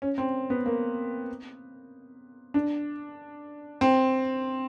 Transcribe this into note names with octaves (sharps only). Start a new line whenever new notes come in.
C#4
C4
B3
A#3
D4
C4